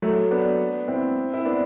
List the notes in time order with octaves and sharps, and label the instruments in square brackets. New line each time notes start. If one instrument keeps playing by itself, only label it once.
[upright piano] F#3 A3
B3 D4
C4 E4
E4
B3 D4